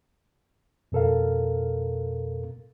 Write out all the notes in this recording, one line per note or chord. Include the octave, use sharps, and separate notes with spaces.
F2 B2 A4 A#4 F5